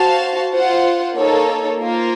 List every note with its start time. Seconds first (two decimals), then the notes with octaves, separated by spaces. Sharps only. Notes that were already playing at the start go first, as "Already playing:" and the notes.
Already playing: F#4 C5 F5 A5
0.52 F4 C5 F#5
1.15 A#3 D#4 A4 C#5
1.79 A#3 F4 C5